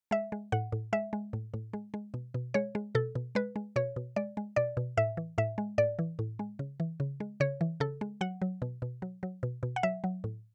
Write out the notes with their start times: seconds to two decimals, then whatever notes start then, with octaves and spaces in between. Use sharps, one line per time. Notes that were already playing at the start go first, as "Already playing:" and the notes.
0.11 G#3 E5
0.32 G#3
0.52 A2 F#5
0.72 A2
0.93 G#3 E5
1.13 G#3
1.33 A2
1.54 A2
1.73 G#3
1.94 G#3
2.14 B2
2.34 B2
2.54 G#3 C#5
2.75 G#3
2.95 B2 A4
3.15 B2
3.35 G#3 B4
3.56 G#3
3.76 B2 C#5
3.96 B2
4.16 G#3 D5
4.37 G#3
4.56 B2 D5
4.77 B2
4.97 A2 E5
5.17 E3
5.38 A2 E5
5.58 G#3
5.78 A2 D5
5.99 E3
6.19 A2
6.39 G#3
6.59 C#3
6.80 E3
7.00 C#3
7.20 G#3
7.40 C#3 C#5
7.61 E3
7.80 C#3 A4
8.01 G#3
8.21 F#3 F#5
8.42 F#3
8.62 B2
8.82 B2
9.02 F#3
9.23 F#3
9.43 B2
9.63 B2
9.76 F#5
9.83 F#3 E5
10.04 F#3
10.24 A2